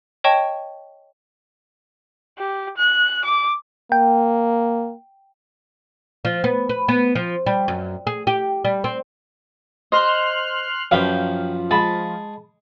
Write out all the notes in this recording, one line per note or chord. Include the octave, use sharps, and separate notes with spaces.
C#5 D#5 G5 A5 C#6
G4
F#6
D6
A#3 G5
F3
B3
B4
B3
F3
G3
F#2
G#4
G4
G3
C4
C5 D#5 C6 F6 F#6
F#2 F3 F#4 B4 F5 G5
G#3 A5 B5